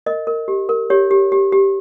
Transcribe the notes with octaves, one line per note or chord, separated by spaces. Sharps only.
A#4 D#5
A#4
G4
A#4
G4 C#5
G4
G4
G4